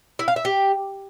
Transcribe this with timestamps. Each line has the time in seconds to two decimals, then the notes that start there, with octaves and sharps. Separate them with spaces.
0.19 E4
0.28 F5
0.36 E5
0.45 G4